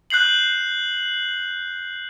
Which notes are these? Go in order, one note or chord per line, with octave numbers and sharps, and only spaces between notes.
F#6 G6 C7 F#7